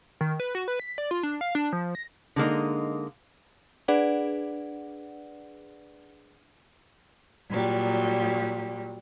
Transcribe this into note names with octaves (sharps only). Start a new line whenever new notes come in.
D#3
B4
F#4
B4
B6
D5
F4
D4
F5
D4
F3
A#6
D3 G#3 A#3 D#4
D4 G#4 B4 D5 F#5
A#2 F#3 G3